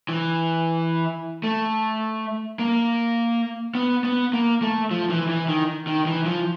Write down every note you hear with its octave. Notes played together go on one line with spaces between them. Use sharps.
E3
A3
A#3
B3
B3
A#3
A3
F3
E3
E3
D#3
D#3
E3
F3